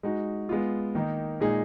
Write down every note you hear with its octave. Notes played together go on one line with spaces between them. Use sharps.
G#3 D#4 F#4
G#3 B3 F4
D#3 A#3 D#4
A#2 G#3 D#4 G#4